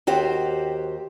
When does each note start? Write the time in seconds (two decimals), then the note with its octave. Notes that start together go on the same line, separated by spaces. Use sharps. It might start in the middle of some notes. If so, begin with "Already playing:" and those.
0.07 D#2 F#4 G4 C5